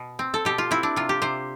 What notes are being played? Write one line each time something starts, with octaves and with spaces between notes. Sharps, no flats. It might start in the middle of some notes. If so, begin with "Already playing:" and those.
Already playing: B2
C4
A4
B2 G4
F4
C4 E4
D4
C3 F4
G4
C3 C5